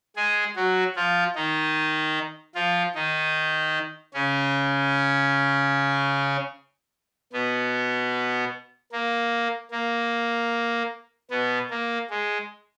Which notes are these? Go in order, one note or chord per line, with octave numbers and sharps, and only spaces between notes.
G#3 G#4
F#3 F#4
F3 F4
D#3 D#4
F3 F4
D#3 D#4
C#3 C#4
B2 B3
A#3
A#3
B2 B3
A#3
G#3